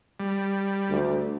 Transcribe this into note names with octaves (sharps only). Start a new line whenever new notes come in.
G3
D2